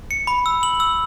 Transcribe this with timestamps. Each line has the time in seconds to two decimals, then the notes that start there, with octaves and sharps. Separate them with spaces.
0.11 C#7
0.27 B5
0.46 E6
0.63 F#7
0.80 E6